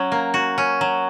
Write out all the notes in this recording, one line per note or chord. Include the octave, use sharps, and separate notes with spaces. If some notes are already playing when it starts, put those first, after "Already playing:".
Already playing: F#3 C#4
A#3
F#4
C#4
F#3